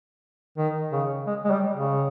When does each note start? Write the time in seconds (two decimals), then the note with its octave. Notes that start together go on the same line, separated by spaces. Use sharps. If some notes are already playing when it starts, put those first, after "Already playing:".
0.58 D#3
0.92 C#3
1.27 G#3
1.45 G#3
1.51 G3
1.74 C#3